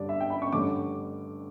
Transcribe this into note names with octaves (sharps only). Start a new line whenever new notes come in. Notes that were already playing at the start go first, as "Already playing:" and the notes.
Already playing: G2 D3 G3 D4 D5
E5
G5
B5
C#6
G2 D3 A3 C#4 D6